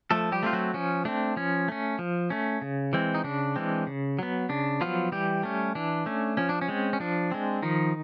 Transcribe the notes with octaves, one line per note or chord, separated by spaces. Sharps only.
F3 A3 A4
G3 G4
A3 C4 F4
F#3 F#4
F3 C#4
A3 C4 D4
F3 C#4
A3 C#4
F3
A3 C#4
C#3
E3 G#3 C4
D#4
C#3 D4
E3 G#3 C4
C#3
F#3 B3
C#3 D4
F3 F#3 B3 F4
E3 G3 G4
A3 C#4
E3 D4
A3 C#4
F3 C#4
D4
C#4
G#3 C4
C#4
F3 D4
G#3 C4
D#3 F3 D#4